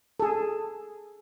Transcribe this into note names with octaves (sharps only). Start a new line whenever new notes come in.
G#4 A4